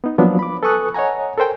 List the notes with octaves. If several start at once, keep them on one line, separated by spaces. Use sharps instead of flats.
B3 D#4
F3 F#3 A#3 B3 D4
B5 D6
A4 B4 G#5 C#6 D#6 F#6
C#5 D#5 F#5 G#5 A#5
A4 A#4 C5 G5 G#5